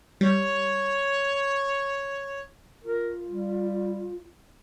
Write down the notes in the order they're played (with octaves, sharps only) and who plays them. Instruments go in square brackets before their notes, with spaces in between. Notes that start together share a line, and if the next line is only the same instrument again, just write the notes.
[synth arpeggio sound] G3 [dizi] C#5
[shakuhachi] F4 [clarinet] A#4
[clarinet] G3